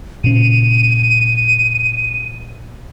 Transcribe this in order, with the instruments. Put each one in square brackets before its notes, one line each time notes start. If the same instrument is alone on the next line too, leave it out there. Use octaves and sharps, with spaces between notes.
[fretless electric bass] A#2 C#3 C#4 [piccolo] D#7